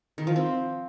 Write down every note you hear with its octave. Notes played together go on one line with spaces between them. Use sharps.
D#3
F3
C4